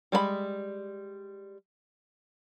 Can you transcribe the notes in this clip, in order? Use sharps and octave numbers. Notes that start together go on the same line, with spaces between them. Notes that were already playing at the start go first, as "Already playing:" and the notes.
G3 G#3 C5 B5